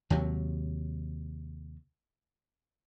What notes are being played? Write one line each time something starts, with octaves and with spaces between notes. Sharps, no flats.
D#2 C3 F#3